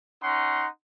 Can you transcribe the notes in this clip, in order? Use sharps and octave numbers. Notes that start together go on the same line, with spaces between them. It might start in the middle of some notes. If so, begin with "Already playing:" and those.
C#4 D#4 F#5 C6